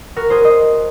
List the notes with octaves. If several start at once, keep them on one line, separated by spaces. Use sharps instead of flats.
F#4 A#4
G#4 C5
C5 D#5